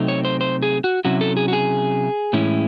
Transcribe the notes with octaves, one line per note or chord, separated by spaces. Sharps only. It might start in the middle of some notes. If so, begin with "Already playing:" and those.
Already playing: C3 F#3 A3 C4 D#4
C#5
C5
C5
G#4
F#4
C3 F#3 C#4 E4 F#4
A4
G#4
F#4
G#4
A2 E3 G#3 C#4 E4